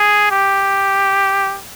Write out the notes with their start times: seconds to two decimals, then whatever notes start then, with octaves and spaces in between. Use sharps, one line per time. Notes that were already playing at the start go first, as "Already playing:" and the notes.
Already playing: G#4
0.31 G4